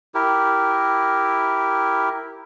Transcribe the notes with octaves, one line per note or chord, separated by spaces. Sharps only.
E4 G4 A#4